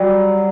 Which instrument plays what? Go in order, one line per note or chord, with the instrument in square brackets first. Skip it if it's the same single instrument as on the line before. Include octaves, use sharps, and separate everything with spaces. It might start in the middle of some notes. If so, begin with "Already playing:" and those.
Already playing: [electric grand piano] F#3 [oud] G3